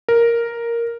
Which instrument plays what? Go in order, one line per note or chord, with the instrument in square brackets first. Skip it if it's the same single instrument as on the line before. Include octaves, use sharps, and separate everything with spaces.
[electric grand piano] A#4